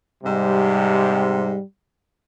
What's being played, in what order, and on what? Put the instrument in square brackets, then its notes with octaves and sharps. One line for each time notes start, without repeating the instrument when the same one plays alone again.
[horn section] G#2 C3 [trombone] G3